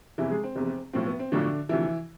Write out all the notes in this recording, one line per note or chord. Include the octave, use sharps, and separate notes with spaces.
F1 E2 C3 E3 E4
G#3 G#4
C4
F1 E2 C3
B1 A2 F3 C4
B3
C4
B1 A2 D3 F3 D4
D2 C3 E3 F3 E4